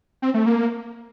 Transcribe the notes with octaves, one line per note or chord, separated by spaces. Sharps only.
C4
A3
A#3